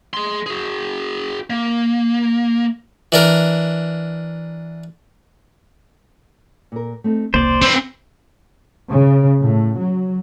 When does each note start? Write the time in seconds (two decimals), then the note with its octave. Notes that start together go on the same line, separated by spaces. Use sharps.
0.14 G#4 C6
0.46 F#4 G#4
1.50 A#3
3.12 E3 D4 A#4
6.72 A#2 A#4
7.04 A3 C4 D#4
7.34 E1 C2 D#3 A#3 C5 D5
7.62 C4 B4
8.91 C#3
9.40 A2
9.78 F#3